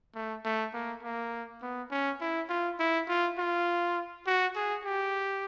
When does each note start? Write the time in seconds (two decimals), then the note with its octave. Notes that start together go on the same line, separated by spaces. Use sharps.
0.15 A3
0.45 A3
0.74 A#3
1.03 A#3
1.62 B3
1.91 C#4
2.21 E4
2.49 F4
2.80 E4
3.08 F4
3.38 F4
4.26 F#4
4.56 G#4
4.85 G4